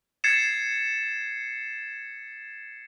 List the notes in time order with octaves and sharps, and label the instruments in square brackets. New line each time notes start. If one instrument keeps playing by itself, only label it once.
[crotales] G#6 A6 C7 C#7 E7